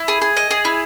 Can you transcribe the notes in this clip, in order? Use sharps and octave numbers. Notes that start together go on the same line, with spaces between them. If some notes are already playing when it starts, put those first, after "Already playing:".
Already playing: E4
G#4
G#4
D#5
G#4
E4